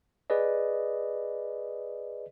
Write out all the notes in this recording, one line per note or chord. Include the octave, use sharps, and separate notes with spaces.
G#4 B4 D5 D#5